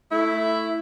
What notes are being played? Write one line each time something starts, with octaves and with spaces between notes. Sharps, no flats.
A3 E4